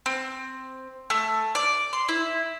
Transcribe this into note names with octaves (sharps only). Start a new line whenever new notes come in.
C4
A3
D5
C6
E4